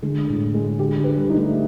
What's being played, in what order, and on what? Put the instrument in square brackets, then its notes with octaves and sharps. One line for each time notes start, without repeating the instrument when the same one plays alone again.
[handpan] D3 [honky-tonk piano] G#3
[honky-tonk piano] A2
G#3
[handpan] D3 [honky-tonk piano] G4
[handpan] D3
[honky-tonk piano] B4
[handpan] G3
[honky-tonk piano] D#4
[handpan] A3